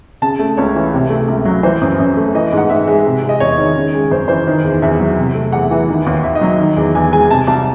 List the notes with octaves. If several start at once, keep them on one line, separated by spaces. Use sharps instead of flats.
C#3 A5
A3
C#2 C#5
E3
C3
A3
C#2
F#3
E3 C5
F#2
F#2
A3
E3 D#5
G#2
F#5
G#2 E5
G#3
C3
G#3
D#5
E2 C#5
D#3
C#3
G#3
F#2 C5
E3 C5
D#3
E2
E2 E5
F#3
C3
A3
E2 F#5
E3
D#3
D#2
D#2 E5
D#5
F#3
D#3
E2
E2 G#5
G#3 G#5
C3 A5
C2 A5